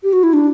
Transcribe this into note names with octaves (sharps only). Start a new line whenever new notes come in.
G4
F#4
E4
D4